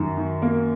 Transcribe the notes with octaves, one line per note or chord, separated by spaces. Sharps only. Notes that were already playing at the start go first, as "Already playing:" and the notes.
Already playing: F#2 D#3
D#3
A#3